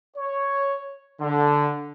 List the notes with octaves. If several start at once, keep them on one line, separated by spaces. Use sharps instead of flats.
C#5
D3